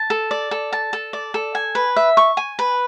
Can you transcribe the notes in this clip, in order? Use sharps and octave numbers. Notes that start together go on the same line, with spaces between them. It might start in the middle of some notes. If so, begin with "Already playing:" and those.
Already playing: A5
A4
D5
A4
A5
A4
D5
A4
G#5
B4
E5
C#6
G#5
B4